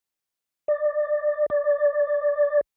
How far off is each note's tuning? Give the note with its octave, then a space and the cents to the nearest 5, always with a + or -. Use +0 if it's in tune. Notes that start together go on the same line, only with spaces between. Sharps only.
D5 +25
D5 -10